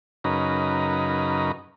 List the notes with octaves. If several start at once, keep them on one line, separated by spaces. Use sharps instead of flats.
F#2 C#3 D#4 A#4 B4